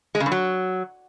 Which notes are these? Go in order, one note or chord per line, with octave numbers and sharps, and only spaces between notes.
G#3
C#3
G2
F#3